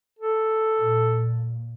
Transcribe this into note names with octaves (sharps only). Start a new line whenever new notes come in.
A4
A#2